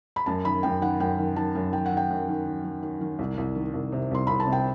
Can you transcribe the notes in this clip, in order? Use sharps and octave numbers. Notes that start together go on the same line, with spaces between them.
B5
F#2 A5
D#3 B5
F#2 G5
D#3 F#5
F#2 G5
D#3
D#3 A5
F#2
D#3 G5
F#5
D#3
G5
F#2
D#3
D#3
D#3
D#3
D#3
C2
C2
D#3
C2
C3
C2 C6
C2 B5
A5
C3
G5